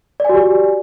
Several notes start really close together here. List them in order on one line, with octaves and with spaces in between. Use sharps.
D5 G#5 F#4 G4